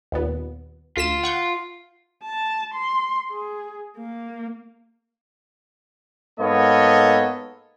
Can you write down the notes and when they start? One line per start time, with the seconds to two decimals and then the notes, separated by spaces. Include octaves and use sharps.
0.12 D#2 A#2 B3
0.97 D2 F4 B6 E7
1.24 F#5 C#6 G6
2.24 A5
2.74 C6
3.31 G#4
3.97 A#3
6.40 G#2 A#3 B3 A4 C#5 D#5